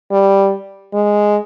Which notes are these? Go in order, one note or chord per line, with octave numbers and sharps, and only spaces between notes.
G3
G#3